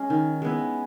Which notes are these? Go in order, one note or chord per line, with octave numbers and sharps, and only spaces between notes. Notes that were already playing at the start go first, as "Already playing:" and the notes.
Already playing: G#3 C#4
D#3
G#3 B3 E4